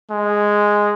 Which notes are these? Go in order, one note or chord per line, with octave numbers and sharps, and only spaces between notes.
G#3